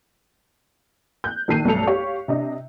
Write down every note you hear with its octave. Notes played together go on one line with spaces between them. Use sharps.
F#6 G6
A#1 D#3 A4 C7 D#7
B1 G2 A3 A4 C#7 F7
G4 C#5 F5 C#6
C3 D4 D#5